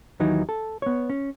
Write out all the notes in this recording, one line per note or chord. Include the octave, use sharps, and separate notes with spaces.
D#2 D#3 E3 F#3 D#4
A4
B3 C#5
C#4